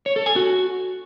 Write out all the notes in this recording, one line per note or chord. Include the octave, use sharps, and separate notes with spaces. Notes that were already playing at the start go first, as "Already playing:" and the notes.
C#5
A4
G#5
F#4